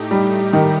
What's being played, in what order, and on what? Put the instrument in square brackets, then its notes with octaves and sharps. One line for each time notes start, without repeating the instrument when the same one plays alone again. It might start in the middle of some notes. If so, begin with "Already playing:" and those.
Already playing: [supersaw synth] A2 A3 D#4 G4
[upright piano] G3
D#3